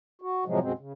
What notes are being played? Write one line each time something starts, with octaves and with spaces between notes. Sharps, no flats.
F#4
A2 C3 F3 F#3 G#3
F#2 B2 G#3 C4
C#3